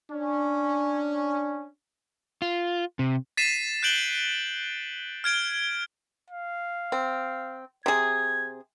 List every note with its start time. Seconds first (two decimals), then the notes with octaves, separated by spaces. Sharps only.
0.11 C#4 D4
2.42 F4
2.99 C3
3.37 A6 B6 C7 D#7 E7
3.83 F#6 G6 D7 F#7 G7
5.24 F6 G#6 D7 G7
6.30 F5
6.92 C4
7.86 C3 G#4 G#6